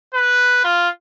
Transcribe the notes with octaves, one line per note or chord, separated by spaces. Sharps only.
B4
F4